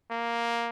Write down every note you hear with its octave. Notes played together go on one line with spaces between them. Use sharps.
A#3